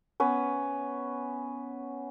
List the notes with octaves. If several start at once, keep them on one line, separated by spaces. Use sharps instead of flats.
B3 C#4 B4